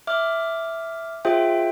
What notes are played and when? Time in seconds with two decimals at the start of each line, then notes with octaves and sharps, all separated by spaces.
0.07 E5 D6 F6
1.25 F4 G#4 C5 E5 G5